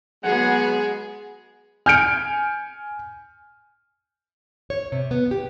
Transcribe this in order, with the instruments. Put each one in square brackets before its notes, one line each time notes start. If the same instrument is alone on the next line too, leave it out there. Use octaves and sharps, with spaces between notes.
[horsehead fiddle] F#3 B3 [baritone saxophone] G#3 [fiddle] G#4 [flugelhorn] F#5
[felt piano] G#5 D7 [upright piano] F6 G6 C#7
[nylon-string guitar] C#5
C3
B3
G4